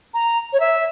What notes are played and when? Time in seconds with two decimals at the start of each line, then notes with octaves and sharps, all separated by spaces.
0.14 A#5
0.53 C#5
0.60 E5